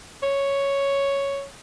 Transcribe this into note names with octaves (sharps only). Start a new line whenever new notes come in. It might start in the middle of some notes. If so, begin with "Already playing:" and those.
C#5